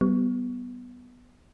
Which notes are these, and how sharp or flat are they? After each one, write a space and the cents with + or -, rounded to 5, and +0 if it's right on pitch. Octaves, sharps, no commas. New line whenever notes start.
G3 -25 B3 +0